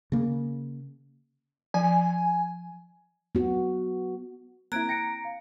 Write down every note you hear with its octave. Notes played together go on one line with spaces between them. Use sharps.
C#3 A#3
F3 G#5
B3 F#4
A#3 C4 E4 A#5 F#6 G#6 D7
G5 A#6 C#7 D7
F5